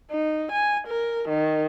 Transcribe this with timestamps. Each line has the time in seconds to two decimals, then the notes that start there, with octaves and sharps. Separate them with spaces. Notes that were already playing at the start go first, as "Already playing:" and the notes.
0.11 D#4
0.52 G#5
0.88 A#4
1.29 D#3